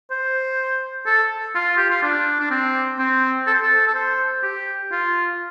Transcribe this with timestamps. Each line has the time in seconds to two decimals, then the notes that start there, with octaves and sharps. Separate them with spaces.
0.11 C5
1.06 A4
1.55 F4
1.77 G4
1.90 F4
2.03 D4
2.40 D4
2.50 C4
2.99 C4
3.47 A4
3.54 C5
3.62 A4
3.87 A4
3.94 C5
4.43 G4
4.91 F4